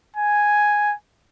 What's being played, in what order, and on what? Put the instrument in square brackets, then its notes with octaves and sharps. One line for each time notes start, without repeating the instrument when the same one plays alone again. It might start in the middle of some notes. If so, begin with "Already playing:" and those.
[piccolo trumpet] G#5